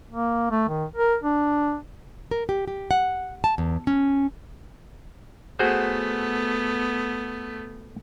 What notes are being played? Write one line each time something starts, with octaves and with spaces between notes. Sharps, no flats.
A#3
A3
D#3
A#4
D4
A#4
G4
G4
F#5
A5
E2
C#4
A3 B3 F#4 G#4 C5